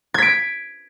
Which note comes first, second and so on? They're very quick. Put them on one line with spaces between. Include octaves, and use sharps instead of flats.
G#6 B6 D7